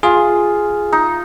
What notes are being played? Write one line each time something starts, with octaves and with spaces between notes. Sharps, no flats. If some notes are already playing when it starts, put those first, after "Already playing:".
F4 G#4
D#4